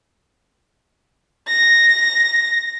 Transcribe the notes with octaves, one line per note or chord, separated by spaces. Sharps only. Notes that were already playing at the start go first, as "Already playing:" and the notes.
A#6